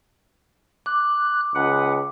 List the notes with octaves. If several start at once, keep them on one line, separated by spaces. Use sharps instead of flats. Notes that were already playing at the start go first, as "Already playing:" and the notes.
D6 F#6
C#2 B4 F#5